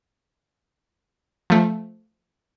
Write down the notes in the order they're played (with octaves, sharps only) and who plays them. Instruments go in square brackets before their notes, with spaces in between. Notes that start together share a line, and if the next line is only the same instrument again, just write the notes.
[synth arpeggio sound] F3 A3